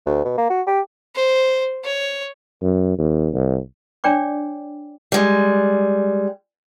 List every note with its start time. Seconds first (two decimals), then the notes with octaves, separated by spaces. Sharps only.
0.06 D2
0.25 B2
0.38 A#3
0.50 F#4
0.67 G4
1.16 C5
1.84 C#5
2.62 F#2
2.98 D#2
3.34 C2
4.04 D4 C#5 D5 G5 D6
5.12 G3 G#3